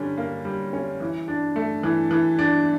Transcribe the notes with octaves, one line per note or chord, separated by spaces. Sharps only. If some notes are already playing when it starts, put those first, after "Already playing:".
Already playing: D3 G3 C#4
A#3
G3
C#4
E3
D4
A3
E3
E3
D4